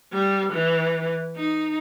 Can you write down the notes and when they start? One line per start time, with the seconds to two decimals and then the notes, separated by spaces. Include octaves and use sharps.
0.12 G3
0.53 E3
1.36 D#4